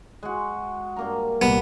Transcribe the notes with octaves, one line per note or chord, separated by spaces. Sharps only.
G#3 F#4
G2 A#3 A#5
C2 A#2 B3